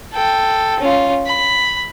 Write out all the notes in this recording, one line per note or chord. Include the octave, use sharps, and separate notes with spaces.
A4 G5
C#4 F4
B5